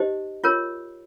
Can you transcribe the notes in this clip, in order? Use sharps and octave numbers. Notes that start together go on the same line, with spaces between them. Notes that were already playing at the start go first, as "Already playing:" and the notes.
Already playing: D#4 G4 C5 D#5
F4 A#4 C#5